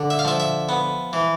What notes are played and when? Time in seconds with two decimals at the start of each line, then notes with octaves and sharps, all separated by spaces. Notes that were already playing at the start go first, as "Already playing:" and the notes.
Already playing: D3
0.10 E5
0.19 F5
0.25 F3 E5
0.40 E5
0.69 B3
1.13 E3